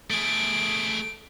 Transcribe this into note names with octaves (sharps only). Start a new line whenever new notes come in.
A3 G#4 D7